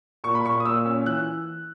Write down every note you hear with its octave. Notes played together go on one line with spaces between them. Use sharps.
A#2 C#6
B5
A#2 C#6
D#6
A#2 E6
C#4
E3 F#6